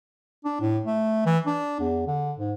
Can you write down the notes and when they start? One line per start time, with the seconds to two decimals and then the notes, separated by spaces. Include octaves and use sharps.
0.45 D4
0.61 A2
0.85 A3
1.26 E3
1.46 D4
1.80 E2
2.07 D3
2.38 G#2